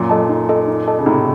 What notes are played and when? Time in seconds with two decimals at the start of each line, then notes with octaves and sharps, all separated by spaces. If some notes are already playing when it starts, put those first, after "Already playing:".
Already playing: F#2 A#2
0.09 A4 D#5 A5
0.29 D#4
0.49 A4 D#5 A5
0.68 D#4
0.87 A4 D#5 A5
0.99 C#3
1.06 A2 C3 D#4